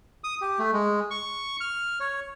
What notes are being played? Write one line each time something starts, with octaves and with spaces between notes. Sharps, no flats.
D#6
G4
A3
G#3
C#6
F6
C#5